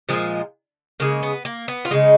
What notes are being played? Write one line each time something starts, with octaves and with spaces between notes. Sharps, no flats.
A#2 F3 G#3
C#3 G#3 A#3
B3
A#3
B3
F4
C#3 G#3 D#4